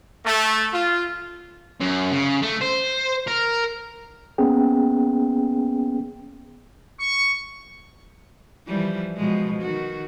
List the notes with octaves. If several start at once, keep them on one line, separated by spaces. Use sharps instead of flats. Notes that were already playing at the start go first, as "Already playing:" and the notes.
A3
F4
F#2
C#3
A3
C5
A#4
A#3 B3 C#4 G#4 G5
C#6
E3 F3 G3
B2 F3 G#3
D#3 F#4